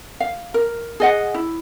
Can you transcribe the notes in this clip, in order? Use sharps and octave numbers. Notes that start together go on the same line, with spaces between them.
F5
A#4
G#4 D#5 F#5
E4